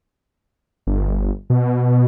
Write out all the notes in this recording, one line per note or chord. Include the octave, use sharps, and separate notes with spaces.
G1
B2